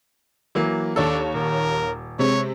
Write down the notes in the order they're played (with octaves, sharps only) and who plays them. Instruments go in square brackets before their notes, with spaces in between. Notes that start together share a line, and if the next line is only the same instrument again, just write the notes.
[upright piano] E3 F#3 A#3
[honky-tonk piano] D#2 C#5 A5 [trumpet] D4 [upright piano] A4
[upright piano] D#1 [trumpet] A#4
[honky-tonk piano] C3 G#3 C4 [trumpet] C#5